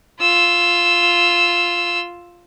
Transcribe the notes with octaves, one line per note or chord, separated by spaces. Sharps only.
F4 E6